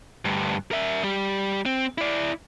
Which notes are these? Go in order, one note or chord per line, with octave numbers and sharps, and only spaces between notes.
D2 G2
A#4 E5
G3 G4
C4
E4 D5